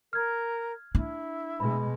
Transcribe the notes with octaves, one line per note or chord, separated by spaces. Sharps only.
A#4 F6 G#6
D4 E4
B2 G#3 B5